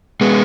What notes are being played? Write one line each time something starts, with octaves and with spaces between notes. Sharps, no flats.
G#3 B3